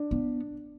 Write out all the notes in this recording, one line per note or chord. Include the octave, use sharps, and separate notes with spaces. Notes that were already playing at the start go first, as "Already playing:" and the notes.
Already playing: D4
B3